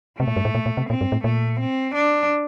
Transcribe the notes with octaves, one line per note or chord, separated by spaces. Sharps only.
C3 A3
A#2
G2
A2
A#2
A#2
C3
A#2 C4
G2
A2
A#2 A3
C4
D4